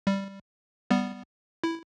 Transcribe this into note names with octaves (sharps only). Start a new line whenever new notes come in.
G3
G3 B3
E4